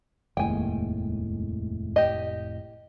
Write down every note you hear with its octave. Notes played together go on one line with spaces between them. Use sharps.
F1 D#2 A2 G#3 G5 G#5
G4 D#5